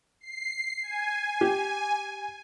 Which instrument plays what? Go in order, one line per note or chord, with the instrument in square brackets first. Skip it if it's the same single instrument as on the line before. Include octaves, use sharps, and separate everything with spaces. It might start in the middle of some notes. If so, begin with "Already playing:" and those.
[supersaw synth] C7
G#5
[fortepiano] G4